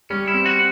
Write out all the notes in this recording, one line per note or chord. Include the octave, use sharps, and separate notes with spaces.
G3 C#4
E4
C4
F#4